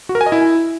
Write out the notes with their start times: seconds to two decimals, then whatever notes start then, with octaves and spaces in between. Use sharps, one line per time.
0.09 F#4
0.15 A#4
0.21 G#5
0.26 D#5
0.32 E4